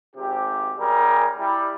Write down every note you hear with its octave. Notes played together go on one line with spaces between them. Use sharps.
G#1 C3 G4
F#2 G3 G#4 A#4
G3 E4